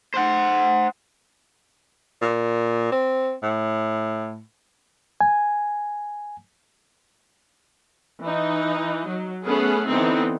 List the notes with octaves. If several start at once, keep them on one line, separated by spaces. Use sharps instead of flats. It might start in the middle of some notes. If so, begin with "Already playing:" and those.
C5 F#5
A#2
C4
A2
G#5
E3 D#4
F#3
A3 B3 C#4 G#4 B4
D3 E3 B3 C4 D#4